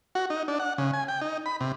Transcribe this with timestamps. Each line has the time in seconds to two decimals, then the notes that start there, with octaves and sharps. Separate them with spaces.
0.15 F#4
0.30 D#4
0.48 D4
0.60 F#5
0.78 C#3
0.94 G#5
1.08 G5
1.21 D#4
1.46 B5
1.61 C3